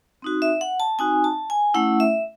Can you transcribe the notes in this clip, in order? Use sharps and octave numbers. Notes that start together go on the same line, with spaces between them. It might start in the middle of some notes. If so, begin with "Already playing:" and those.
C4 D#4 F#4
E5
F#5
A5
C4 D#4 F#4 G#5
A5
G#5
A3 C#4 E4 F#5
E5